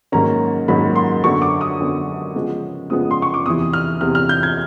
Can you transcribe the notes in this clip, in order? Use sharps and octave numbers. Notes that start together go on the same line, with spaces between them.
G#2 D#3 F#3 A#3 C#4 A#5
G#2 D#3 F#3 A#3 C#4 B5
C6
F#2 D3 F#3 B3 C#6
D6
D#6
F#2 D3 F#3 B3
C#3 F3 G#3 B3
C#3 F3 G#3 B3 D#6
C6
C#6
D6
E2 C3 E3 D#6
F6
E2 C3 E3 F6
F6
G6
G#6